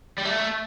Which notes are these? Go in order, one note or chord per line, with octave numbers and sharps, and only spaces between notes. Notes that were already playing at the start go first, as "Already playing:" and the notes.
G3
A3